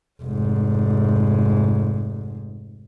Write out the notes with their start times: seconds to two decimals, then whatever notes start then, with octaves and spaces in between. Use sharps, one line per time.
0.22 F1 G#2